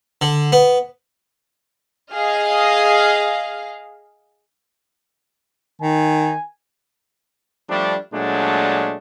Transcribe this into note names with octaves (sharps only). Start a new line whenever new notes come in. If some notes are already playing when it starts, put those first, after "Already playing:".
D3
B3
G#4 D#5 F5 F6
D#3 G#5
F3 G3 A3 D4
A#2 F#3 G#3 A3 D4